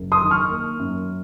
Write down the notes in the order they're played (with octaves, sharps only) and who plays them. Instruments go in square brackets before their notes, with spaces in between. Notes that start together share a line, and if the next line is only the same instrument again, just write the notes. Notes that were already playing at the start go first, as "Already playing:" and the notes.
Already playing: [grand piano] F#1
C6 D#6
D#3
C#6 F6
A#3
F#2